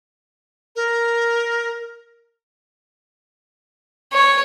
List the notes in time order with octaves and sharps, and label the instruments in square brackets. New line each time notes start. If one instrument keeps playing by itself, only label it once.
[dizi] A#4
[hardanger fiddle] C#5